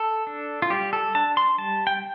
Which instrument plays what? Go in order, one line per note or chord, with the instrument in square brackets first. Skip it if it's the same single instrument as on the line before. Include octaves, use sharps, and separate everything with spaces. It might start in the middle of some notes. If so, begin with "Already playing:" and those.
Already playing: [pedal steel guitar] A4
D4
F4
G3 G4
A4
D4 A5
C6
G3 A5
G5